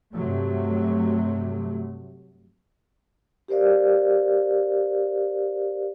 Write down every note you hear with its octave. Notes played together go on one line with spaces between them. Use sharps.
G2 C3 F#3 A3
G4 A#4 C5 D5 F5